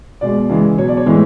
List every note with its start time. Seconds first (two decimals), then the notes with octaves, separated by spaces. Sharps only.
0.21 B2 G#3 D5
0.49 C#3 E3 G#3
0.78 B2 F#3 C#5
0.88 D5
0.97 C#5
1.06 A2 E3 G#3